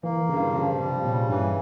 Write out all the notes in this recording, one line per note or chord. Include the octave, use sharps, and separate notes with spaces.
E3 A#3
G2 C#3
C#3 F3
C3 G3
A#2 C#3
G2 E3